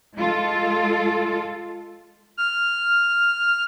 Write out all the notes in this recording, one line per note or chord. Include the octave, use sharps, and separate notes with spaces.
G#3 F4 A4
F6